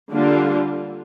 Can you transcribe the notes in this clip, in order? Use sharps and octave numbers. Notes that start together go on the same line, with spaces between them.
D3 G3 A#3 D4 F4